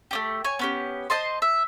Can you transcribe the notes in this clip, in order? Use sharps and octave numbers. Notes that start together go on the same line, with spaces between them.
A3 D4 G4
C#5 G#5
B3 C#4 G4
C5 D#5 A5 C6
E5